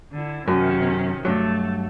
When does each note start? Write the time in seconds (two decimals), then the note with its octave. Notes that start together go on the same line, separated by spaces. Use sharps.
0.13 D3 E4
0.48 F#2 C3 D#3 C#4
1.25 G2 F#3 A3